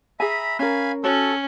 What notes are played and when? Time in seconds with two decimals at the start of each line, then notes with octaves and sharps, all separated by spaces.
0.20 G#4 E5 G#5 A#5 B5
0.59 C#4 A#4 F5 G#5 B5
1.04 C#4 F#4 A4 C#5